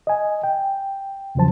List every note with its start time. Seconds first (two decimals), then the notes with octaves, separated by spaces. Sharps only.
0.07 D#5 G#5
0.44 G5
1.35 E2 C#3 F3 F#3 C5 A5